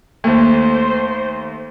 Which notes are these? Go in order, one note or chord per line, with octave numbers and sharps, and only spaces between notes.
D#2 A3 A#3 C5